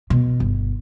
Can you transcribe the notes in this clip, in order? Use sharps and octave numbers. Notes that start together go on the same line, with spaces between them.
B2
G1